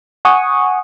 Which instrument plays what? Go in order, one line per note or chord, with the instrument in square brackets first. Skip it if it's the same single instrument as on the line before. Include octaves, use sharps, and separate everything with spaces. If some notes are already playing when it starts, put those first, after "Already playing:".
[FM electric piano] F#5 G#5 C#6 D#6